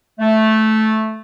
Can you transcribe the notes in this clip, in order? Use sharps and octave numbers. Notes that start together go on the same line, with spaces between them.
A3